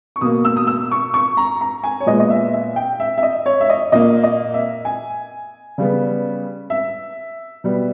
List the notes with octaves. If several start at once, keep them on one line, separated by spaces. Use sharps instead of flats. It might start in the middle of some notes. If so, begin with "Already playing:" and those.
C#6
B2 A#3 D#6
E6
D#6
E6
C#6
C#6
A#5
A#5
G#5
C#5
A#2 G#3 B3 D#5
D#5
E5
E5
G5
E5
E5
D#5
C#5
E5
D#5
A#2 A#3 D#5
D#5
E5
G#5
C#3 G3 B3
E5
B2 G3 B3